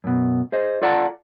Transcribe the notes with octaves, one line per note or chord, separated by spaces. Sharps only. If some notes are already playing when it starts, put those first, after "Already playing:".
F#2 B2
G#4 C5 D#5
F4 A4 D5 F#5 A5 A#5